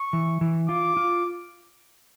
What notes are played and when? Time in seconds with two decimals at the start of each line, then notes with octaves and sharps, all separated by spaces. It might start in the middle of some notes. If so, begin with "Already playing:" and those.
Already playing: C#6
0.13 E3
0.41 E3
0.69 F4 D6
0.97 F4